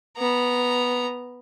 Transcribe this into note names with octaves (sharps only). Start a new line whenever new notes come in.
B3 A#5